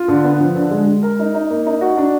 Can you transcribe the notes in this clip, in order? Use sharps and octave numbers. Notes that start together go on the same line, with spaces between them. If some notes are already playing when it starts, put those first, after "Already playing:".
Already playing: F4
D3
B3
F3
D3
G#3
G#3
A#4
D#4
D#4
A#3
D#4
F#4
D4